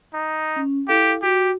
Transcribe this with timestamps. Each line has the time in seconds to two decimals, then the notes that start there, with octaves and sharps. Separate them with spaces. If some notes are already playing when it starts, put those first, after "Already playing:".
0.14 D#4
0.56 C#4
0.88 E4 G4 A4 F5
1.23 F#4 G4